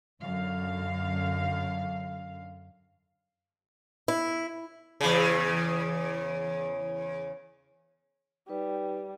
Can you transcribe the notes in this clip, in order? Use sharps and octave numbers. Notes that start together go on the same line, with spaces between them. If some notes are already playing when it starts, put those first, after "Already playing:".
F#2 D3 F5
E4
E2 C#3
G3 D#4 B4